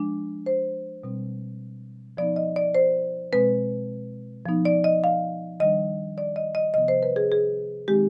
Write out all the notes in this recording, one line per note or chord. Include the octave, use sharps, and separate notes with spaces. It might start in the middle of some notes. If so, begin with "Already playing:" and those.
Already playing: F3 G#3 D4
C5
B2 G3 C4
F3 B3 D#4 D5
D#5
D5
C5
B2 G#3 C4 B4
F3 B3 D#4
D5
D#5
F5
D#3 G3 D4 D#5
D5
D#5
D#5
C3 F3 B3 D#5
C5
B4
G#4
G#4
D#3 G#3 C4 D#4 G4